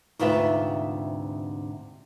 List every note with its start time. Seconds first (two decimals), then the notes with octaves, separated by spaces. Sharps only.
0.19 D2 G#2 C3 F4 B4 E5